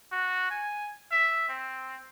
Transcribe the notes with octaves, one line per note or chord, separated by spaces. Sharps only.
F#4
G#5
E5
C4